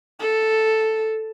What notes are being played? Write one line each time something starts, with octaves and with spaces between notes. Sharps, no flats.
A4